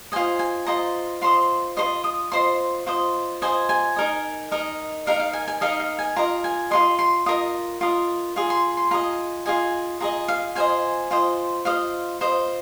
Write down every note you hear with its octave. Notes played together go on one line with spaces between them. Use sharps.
F4 C5 D#5 G#5
G#5
F4 C5 D#5 A#5
F4 C5 D#5 C6
F4 C5 D#5 C6
D#6
F4 C5 D#5 C6
F4 C5 D#5
F4 C5 D#5 G#5
G#5
D#4 A#4 D#5
D#4 A#4 D#5
D#4 A#4 D#5 F5
F5
G#5
G#5
D#4 A#4 D#5 F5
F5
G#5
F4 A#4 D#5 A#5
G#5
F4 A#4 D#5 C6
C6
F4 A#4 D#5 D#6
F4 A#4 D#5
F4 G#4
C6
C6
F4 G#4 D#5 A#5
F4 G#4 D#5 G#5
F4 G#4 D#5 A#5
F5
F4 C5 D#5 G#5
F4 C5 D#5
F4 C5 D#5 F5
F4 C5 D#5